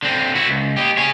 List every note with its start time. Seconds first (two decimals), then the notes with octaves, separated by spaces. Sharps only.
0.03 D3 C4
0.35 E4 F#4
0.49 C#2
0.77 G4 D#5
0.97 G#4 C#5